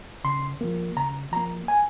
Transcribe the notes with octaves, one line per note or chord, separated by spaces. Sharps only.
C#3 C6
F3 A#3
C#3 A#5
F3 A#3 A#5
G#5